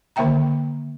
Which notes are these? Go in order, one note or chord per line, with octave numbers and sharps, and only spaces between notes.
D3 D#3 A#3 E5 G5 A#5